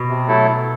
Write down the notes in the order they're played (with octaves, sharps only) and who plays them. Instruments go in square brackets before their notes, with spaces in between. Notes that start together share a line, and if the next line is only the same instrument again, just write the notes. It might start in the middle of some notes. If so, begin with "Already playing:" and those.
Already playing: [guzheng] B2
[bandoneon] C3
F#3 A3 E4 A4